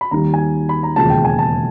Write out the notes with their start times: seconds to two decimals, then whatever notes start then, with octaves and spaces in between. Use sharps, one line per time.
0.01 B5
0.11 D#2 D#3 G3 A#5
0.34 G#5
0.69 B5
0.83 A#5
0.96 E1 D#2 C#3 F3 G#3 A5
1.10 G5
1.25 G#5
1.39 A5